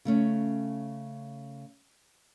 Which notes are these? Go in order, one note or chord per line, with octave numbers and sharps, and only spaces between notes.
C#3 A3 C#4